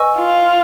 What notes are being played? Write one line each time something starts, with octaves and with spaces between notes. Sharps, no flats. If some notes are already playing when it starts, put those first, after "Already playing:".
Already playing: B4 D#5 G#5 C#6 E6
F4